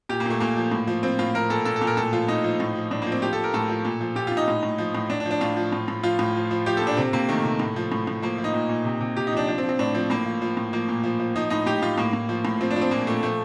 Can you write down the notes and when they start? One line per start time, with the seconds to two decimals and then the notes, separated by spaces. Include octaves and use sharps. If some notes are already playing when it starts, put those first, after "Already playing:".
0.09 A#2 G4
0.20 A#3
0.26 A#2 A3
0.40 A#2 A#3
0.57 F3
0.72 A2
0.87 F3
1.03 F3 C4
1.19 A2 F4
1.34 F3 A#4
1.50 A#2 A4
1.65 A#2 A4
1.76 A4
1.81 A#2
1.87 A#4
1.97 A2 A4
2.13 F3 F4
2.28 A2 D#4
2.44 F3
2.60 A2
2.75 F3
2.91 A2 D4
3.02 F3 A#3
3.12 C4
3.22 F3 G4
3.33 F3 A4
3.44 A#4
3.54 A2 A4
3.69 F3
3.85 A#2
4.01 F3
4.16 A#2 G4
4.27 A#2 F4
4.37 D#4
4.48 A2
4.63 A2
4.78 F3
4.95 A2
5.10 A2 D4
5.20 D4
5.26 F3
5.31 D4
5.41 A2 F4
5.57 F3
5.72 A2
5.88 A2
6.03 F3 F4
6.19 A2
6.35 F3
6.51 F3
6.66 F3 G4
6.77 A#2 A4
6.87 D4
6.97 C3 C4
7.13 C3 A#3
7.29 D#3 A3
7.45 C3
7.59 A2
7.76 F3
7.92 A2
8.07 A2
8.22 F3 A#3
8.38 F3
8.44 D#4
8.54 A#2
8.69 A#2
8.85 C3
9.01 C3
9.17 C3 G4
9.27 D#4
9.32 F3 D4
9.47 F3 D4
9.58 C4
9.64 F3
9.69 C4
9.79 A2 D4
9.94 F3 C4
10.10 A2 A#3
10.26 F3
10.42 F3
10.57 A2
10.73 F3 A#3
10.88 A#2
11.03 F3
11.19 F3
11.36 F3 D#4
11.50 A2 D#4
11.66 A2 G4
11.82 A2 F4
11.98 A2 A#3
12.13 A2
12.29 F3
12.45 A2
12.61 F3 C4
12.71 D4
12.76 F3
12.81 C4
12.91 A#2 A#3
13.07 A#2 A3
13.23 F3 A3